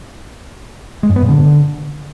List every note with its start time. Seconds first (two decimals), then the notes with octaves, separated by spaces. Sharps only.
1.03 G#3
1.10 F#2
1.16 B3
1.22 A#2
1.29 D3